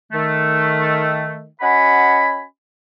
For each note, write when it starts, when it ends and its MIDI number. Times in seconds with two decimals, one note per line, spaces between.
0.12 1.46 51
0.12 1.46 57
1.61 2.43 61
1.61 2.43 66
1.61 2.43 75
1.61 2.43 78
1.61 2.43 80
1.61 2.43 83